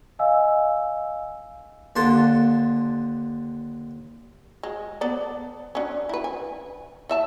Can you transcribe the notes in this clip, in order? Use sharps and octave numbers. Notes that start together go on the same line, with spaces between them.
D#5 F5 G#5 E6
D#2 D3 A5 C6
G#3
B3 A4 D5
C#4 D4
E4 B4
G#5
E3 E5 A5